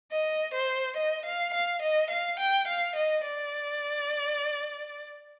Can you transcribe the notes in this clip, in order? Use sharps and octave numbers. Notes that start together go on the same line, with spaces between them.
D#5
C5
D#5
F5
F5
D#5
F5
G5
F5
D#5
D5